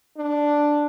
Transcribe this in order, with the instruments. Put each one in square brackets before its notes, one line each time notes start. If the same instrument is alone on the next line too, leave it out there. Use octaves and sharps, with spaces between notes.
[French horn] D4